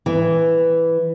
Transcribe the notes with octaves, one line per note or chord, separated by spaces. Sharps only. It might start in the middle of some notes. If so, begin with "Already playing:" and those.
E3